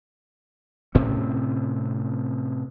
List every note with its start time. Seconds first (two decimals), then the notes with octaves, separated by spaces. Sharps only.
0.95 A2 C3 C4 C#4